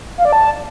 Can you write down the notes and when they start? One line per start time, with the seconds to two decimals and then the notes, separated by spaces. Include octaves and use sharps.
0.18 F5
0.25 D5
0.33 A5